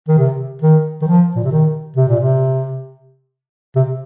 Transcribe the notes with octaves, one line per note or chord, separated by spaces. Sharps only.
D#3
C3
D#3
D#3
F3
A#2
C3
D#3
C3
A#2
C3
C3